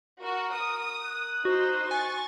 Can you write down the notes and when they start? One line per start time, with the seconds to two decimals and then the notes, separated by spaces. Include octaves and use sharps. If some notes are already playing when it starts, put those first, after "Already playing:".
0.22 F#4 A#4
0.54 D#6
1.03 F#6
1.45 D#4 F#4 C5
1.91 G#5 C#6 A6